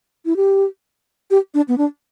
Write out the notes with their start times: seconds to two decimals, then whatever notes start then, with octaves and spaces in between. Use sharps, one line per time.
0.25 E4
0.36 G4
1.31 G4
1.54 D4
1.68 B3
1.78 D4